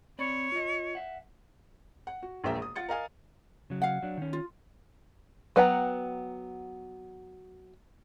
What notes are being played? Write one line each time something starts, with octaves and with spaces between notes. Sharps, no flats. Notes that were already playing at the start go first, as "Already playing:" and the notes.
C4 C#5 D5 B5
F4 D#5
E5 F#5
F#5
F#4
E1 A#1 A#3 E5 G5 A#5
D#6
F4 F#5 A6 C#7
A#4 D#5 F5 G#5
C#3 F#3
F5 F#5
F#3 D4
D#3 C#4
F4
F#3 B3 F#5 G5 A#5